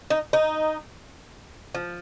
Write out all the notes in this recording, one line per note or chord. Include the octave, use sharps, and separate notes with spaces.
D#4
D#4
F3